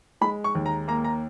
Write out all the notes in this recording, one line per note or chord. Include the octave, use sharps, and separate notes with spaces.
G#3 B5
C#6
D#2
A#5
A#3 A#5
A#5